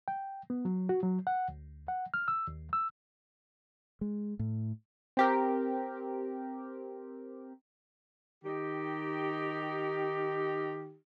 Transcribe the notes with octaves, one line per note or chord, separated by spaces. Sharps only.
G5
B3
F#3
F#4
F#3
F#5
D2
F#5
F6
E6
D#2
E6
G#3
A2
C4 G4 A#4
D#3 D#4 G4